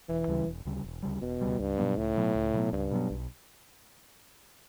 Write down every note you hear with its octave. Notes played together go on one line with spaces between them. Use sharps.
E1 E3
D2 C#3 G3
E1
D2 C#3 G3
E1
D2 C#3 G3
E1 B2
D2 C#3 G3
C#2 G2
B2 F#3 B3
C#2 A2
B2 F#3 B3
C#2
B2 F#3 B3
C#2 G2
B2 F#3 B3
B1